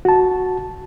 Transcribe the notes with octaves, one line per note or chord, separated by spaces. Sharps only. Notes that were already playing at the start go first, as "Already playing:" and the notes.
F#4 A5